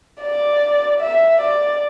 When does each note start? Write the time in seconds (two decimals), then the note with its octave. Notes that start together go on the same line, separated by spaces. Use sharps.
0.22 D5
1.01 E5
1.41 D5